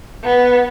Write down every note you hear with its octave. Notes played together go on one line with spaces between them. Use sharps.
B3